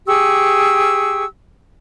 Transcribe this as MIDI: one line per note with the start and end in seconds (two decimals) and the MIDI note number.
0.07 1.24 67
0.07 1.24 68
0.07 1.24 85
0.07 1.24 88